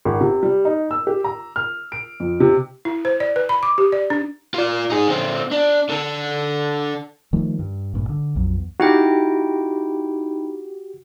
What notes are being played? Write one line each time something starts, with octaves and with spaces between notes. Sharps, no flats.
G#1
C3
G3
D#4
E6
G4
A#5
F6
D7
F2
C3
E4
C5
D5
B4
B5
D6
G4
D5
D4
F4 D5
D#4 G#4
D3 C4
D4
D3 A4
D#3 F3 G3 A3
G2
G#1 G2 A#2
D3
A#1 F2 F#3
E2
D#4 E4 F#4 G4 G5